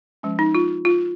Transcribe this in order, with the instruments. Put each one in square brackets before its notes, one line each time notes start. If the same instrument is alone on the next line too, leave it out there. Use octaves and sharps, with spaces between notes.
[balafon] F3 G#3 C#4
D#4
F4
F4